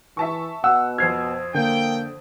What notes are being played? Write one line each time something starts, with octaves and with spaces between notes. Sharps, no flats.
E3 E5 A5 C#6
B2 F#5 E6
F2 C5 F6 G#6 C7
D3 A#3 G5